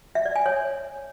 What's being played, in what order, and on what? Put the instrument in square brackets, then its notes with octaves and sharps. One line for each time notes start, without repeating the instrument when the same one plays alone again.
[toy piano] E5
D5
G#5
C#5